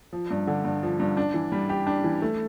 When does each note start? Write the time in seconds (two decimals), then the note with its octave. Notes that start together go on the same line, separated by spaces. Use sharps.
0.13 F3
0.31 G2
0.47 D3
0.65 G2
0.83 F3
1.00 G2
1.17 D4
1.34 E3
1.52 G3
1.69 G4
1.87 D4
2.04 E3
2.22 A3